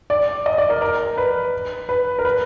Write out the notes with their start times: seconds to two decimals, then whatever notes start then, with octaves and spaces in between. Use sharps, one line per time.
0.10 D5
0.46 D#5
0.58 D5
0.70 A#4
0.82 A#4
1.18 B4
1.89 B4
2.19 A#4
2.25 B4